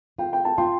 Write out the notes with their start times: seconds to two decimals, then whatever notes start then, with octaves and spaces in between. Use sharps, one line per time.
0.18 F4 G5
0.33 G5
0.45 A5
0.58 F4 G5 C6